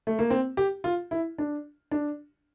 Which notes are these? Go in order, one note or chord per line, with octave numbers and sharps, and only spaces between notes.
A3
A#3
C4
G4
F4
E4
D4
D4